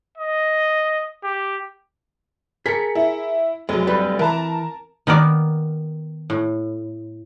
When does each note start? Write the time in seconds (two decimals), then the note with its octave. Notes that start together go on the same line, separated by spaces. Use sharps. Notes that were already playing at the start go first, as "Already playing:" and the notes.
0.17 D#5
1.24 G4
2.66 G#4 A#4 B6 C#7
2.95 E4
3.69 F1 F#3 G#3
3.87 G3 B4
4.19 E3 A#4 A5 A#5
5.07 D#3 B3 A#4 D5
6.30 A2